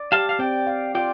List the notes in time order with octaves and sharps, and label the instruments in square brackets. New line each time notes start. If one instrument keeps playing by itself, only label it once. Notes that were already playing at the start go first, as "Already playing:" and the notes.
Already playing: [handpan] D5
[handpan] G4 [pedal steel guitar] F5 A5
[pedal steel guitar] F5
[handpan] C4 [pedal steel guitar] D5 G5
[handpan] F5
[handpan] F4 [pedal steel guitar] D5 G5